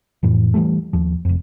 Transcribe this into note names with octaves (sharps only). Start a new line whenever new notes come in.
F2 A2 E3
E3 F3 G3 A3
D#2 F3
F1 F2